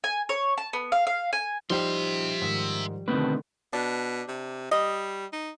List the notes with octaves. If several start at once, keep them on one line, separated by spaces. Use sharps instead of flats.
G#5
C#5
A5
B3
F5
F5
G#5
F3 G3 D#4 C5 E5 G5 C6
G#2 D#3
B2 D3 D#3 A3 C4 B4
B2 D4
C3
G3 D#5
D#4